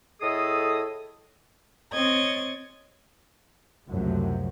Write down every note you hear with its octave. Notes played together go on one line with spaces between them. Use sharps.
A2 G#4 A4 D#5 D#6
C4 C#5 D#5 G#6 A6
C#2 F#2 C3 F3 F#3 A3